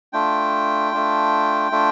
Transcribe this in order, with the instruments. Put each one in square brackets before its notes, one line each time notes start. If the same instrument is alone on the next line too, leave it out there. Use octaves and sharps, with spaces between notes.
[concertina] A3 D4 F4 G5
A3 D4 F4
A3 D4 F4